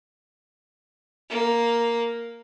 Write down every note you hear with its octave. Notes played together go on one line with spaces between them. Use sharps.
A#3